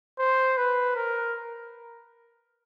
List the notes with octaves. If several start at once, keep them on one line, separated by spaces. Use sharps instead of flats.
C5
B4
A#4